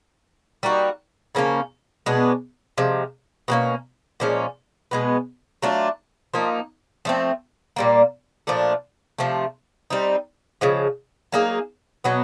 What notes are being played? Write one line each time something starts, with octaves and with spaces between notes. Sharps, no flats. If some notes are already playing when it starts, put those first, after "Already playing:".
G3 A#3 D#4 F#4
C#3 F3 A#3 C#4
B2 G#3 B3 D4
C3 F3 G#3
B2 G3 A#3 C#4
A#2 F3 G#3 C#4
B2 G#3 B3
F#3 A3 D4 F4
F3 A#3 D#4
F3 A3 C4
A#2 G3 A#3
A#2 F3 A3 D4
C3 F3 A3
G3 C4 D#4
C#3 F3 G#3
F#3 A#3 D#4 G#4
B2 F#3 B3